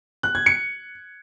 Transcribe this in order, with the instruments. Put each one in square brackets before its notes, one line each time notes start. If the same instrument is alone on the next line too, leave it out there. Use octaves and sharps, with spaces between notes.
[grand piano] F#6
G#6
C#7